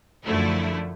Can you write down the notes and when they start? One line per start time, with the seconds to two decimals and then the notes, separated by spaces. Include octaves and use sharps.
0.25 F#2 D3 F3 A3 E4